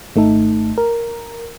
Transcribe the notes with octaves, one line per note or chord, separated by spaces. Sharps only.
G#1 A3 D#4 A4
A#4